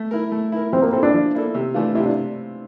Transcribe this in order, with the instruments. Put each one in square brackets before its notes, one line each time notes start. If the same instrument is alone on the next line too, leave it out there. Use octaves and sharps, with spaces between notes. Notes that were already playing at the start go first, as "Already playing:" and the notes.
Already playing: [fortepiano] A3
E4 A#4
A3
E4 A#4
[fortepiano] F3 [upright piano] C4
[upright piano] A#3
[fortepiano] A#3 E4 A4 [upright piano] C4
[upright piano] D4
[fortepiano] F3
A#3 E4 A4
C3
E3 A3 D4 F4
[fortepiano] C3 [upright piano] E4
[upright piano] D4